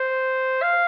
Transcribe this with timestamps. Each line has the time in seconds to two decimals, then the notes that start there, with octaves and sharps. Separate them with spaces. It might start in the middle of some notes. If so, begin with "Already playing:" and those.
Already playing: C5
0.62 F5